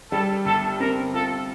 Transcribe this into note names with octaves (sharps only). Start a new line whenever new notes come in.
G3 A4
G1 A4
C4 A#4
F4 A4